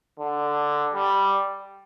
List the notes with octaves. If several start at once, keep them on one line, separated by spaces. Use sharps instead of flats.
D3
G3